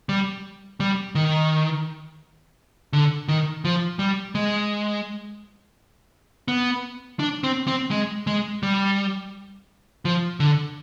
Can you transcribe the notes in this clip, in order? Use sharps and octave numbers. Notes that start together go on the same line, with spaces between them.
G3
G3
D#3
D3
D#3
F3
G3
G#3
B3
D4
C4
C4
G#3
G#3
G3
F3
D3